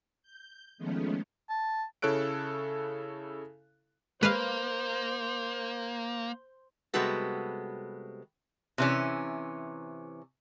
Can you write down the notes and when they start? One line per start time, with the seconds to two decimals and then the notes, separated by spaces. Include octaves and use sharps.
0.22 G6
0.78 D#3 F3 G#3 A3 B3 C#4
1.50 A5
2.02 C#3 E4 A4 C#5 F#6 D7
4.23 G#3 A#3 B4 C5 F5
6.94 C3 G3 G#3 B3 F#4 A4
8.78 C3 E3 C#4